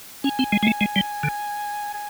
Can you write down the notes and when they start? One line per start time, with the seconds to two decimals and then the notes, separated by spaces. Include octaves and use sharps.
0.24 C#4 G#5
0.39 C4
0.52 G#3
0.63 G#3
0.67 A3
0.81 G#3
0.96 G3
1.23 D3
1.94 G#5